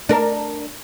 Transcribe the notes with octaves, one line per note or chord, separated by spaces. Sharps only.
D4 A#4